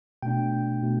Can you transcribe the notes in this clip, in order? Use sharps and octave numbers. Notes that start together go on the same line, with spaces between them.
B2 A3 D4 G5
B2 A3